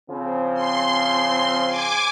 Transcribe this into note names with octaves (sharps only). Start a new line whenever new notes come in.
C#3 F3 C4
C6
G#5 D6